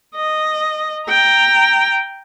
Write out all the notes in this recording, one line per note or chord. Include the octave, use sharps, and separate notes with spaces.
D#5
G5 A#5